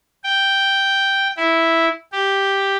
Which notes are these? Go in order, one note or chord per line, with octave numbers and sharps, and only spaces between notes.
G5
E4
G4